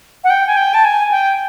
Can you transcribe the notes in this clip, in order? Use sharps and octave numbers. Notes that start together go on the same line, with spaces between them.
F#5
G5
G#5
G5
A5
G#5
G5